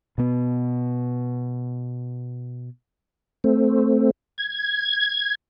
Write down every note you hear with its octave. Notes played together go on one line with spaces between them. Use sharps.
B2 B3
A3 C4
G#6